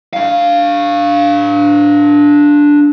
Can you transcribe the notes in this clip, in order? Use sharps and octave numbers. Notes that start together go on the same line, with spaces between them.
D4 F5